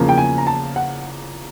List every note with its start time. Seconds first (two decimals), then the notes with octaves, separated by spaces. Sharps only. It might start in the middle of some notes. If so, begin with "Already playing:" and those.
Already playing: E2 C#3 F3 A#3
0.09 G5
0.18 G#5
0.38 A#5
0.47 A5
0.76 F#5